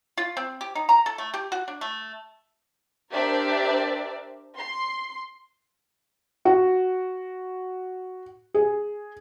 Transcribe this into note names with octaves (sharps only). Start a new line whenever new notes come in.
F4
C4
G4
D#4
A#5
A4
A3
G4
F#4
D4
A3
D4 G4 A#4 C5 D5 E5
C6
F#4
G#4